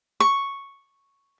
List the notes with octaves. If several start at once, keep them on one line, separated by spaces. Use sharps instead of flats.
C#6